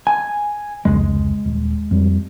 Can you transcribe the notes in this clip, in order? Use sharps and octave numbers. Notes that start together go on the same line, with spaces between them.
G#5
F1 C#2 G#3
D#1
F2 G3